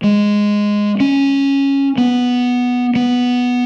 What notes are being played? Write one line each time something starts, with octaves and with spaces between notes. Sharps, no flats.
G#3
C#4
B3
B3